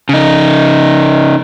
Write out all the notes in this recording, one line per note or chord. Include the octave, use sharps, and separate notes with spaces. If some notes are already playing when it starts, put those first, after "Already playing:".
C#3 D#4